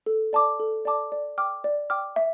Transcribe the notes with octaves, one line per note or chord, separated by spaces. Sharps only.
A4
D5 A5 D6
A4
D5 A5 D6
D5
G5 D6 F6
D5
G5 D6 F6
E5